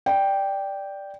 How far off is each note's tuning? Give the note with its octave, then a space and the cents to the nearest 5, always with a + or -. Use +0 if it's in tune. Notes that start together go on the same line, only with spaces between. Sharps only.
D5 +0 G5 +0